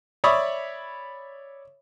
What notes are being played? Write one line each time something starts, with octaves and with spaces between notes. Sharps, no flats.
C#5 D5 E5 B5 C#6 D#6